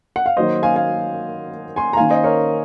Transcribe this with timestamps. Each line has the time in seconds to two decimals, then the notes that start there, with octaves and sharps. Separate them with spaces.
0.16 F#5
0.26 F5
0.37 D#3 F#3 A#3 C5 D#5
0.63 F5 G#5
0.76 F5 G#5
1.76 G#5 C6
1.93 A#5
1.97 D#3 A#3 C#4 F5 G#5
2.10 C5 D#5
2.24 A#4 C#5